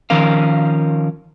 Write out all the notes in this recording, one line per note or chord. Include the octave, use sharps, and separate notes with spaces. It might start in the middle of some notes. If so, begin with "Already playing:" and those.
D#3 F3 C#4 A#4 F5